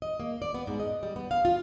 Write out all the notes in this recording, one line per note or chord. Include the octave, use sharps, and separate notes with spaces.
D#5
A#3
D5
B3
G#2
D#5
G3
B3
F5
F4